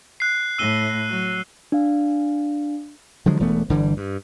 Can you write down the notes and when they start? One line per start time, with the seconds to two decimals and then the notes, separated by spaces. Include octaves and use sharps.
0.20 F#6 C7
0.58 A2 E6 D#7 G7
1.10 F#3
1.72 D4 F5
3.26 D3 F3 F#3 G#3
3.40 E1 E3 A3 B3
3.69 G1 D3 E3 G3
3.97 G2